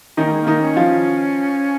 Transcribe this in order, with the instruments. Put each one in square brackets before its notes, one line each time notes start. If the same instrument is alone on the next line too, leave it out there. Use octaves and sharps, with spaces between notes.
[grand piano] D#3 D#4 [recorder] C#4
[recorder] A#3
G#3
A#3
[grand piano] D#3 D#4
[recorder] C#4
[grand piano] F3 F4